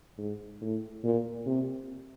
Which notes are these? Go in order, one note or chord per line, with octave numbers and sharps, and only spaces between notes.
G#2
A2
A#2
C3